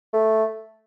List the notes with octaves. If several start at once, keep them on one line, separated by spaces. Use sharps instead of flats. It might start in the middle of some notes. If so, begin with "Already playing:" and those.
A3